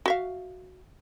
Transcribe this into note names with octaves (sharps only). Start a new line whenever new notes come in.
F#4 E5 F5